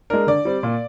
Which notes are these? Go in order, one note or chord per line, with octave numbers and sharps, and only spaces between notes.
G#3 D4 A#4
D3 D5
G3 C4
A#2